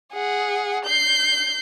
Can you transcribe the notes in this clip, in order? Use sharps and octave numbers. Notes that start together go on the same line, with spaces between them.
G#4 F#5
G6 C7